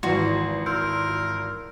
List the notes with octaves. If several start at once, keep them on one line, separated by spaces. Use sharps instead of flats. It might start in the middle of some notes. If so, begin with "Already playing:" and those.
G#1 E3 F3 F#4 B4 C6
A#4 C6 E6 G6